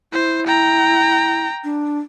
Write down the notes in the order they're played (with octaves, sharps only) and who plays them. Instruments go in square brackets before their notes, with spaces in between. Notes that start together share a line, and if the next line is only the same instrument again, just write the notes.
[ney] E4 [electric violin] C5
[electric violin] G5 A#5
[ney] D4